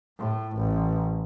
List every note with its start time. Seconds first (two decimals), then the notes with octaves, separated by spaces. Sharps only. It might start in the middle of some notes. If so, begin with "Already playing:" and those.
0.18 A2
0.57 A1